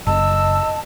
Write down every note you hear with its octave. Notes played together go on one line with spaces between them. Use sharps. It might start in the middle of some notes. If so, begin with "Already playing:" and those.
F#1 D#5 A5 E6